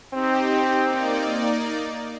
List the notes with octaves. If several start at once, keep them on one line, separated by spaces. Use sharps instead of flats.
C4 D#4 G4
A#3 D#4 D5